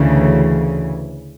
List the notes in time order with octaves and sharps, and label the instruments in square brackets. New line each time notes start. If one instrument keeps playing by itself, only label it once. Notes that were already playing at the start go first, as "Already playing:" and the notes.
Already playing: [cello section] D2 C#3 E3